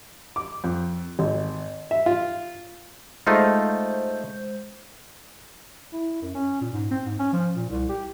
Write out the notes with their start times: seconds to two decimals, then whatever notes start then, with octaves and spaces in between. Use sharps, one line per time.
0.36 D6
0.64 F2
1.19 G#1
1.91 E5
2.06 F4
3.27 G#3 A3 D#4 F4 C5 G6
5.93 E4
6.22 F#2
6.35 C#4
6.61 A#2
6.73 G#2
6.91 C4
7.05 G#2
7.19 C#4
7.33 F3
7.56 A#2
7.70 C2
7.89 G4